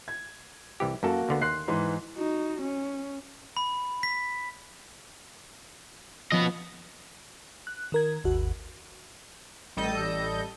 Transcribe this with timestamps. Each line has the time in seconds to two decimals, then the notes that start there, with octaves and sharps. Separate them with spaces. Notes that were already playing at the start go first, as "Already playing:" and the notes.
0.08 G#6
0.80 C2 E3 G4
1.03 F#2 A#3 F#4 A4 A5
1.29 D2 D3 B3
1.41 D#2 A#3 C6 F#6 C7
1.68 G#2 E3 C6
2.16 D#4 F#4
2.61 C#4
3.57 B5
4.03 B6
6.32 F3 B3 C#4 D#5
7.67 F#6
7.92 D#3 A#4 G#6
8.24 G#1 D#2 F#4
9.77 A1 G3 A4 D#5 G6